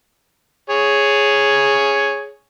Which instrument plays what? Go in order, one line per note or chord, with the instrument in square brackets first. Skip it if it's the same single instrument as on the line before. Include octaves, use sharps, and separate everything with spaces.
[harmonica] G#4 C#5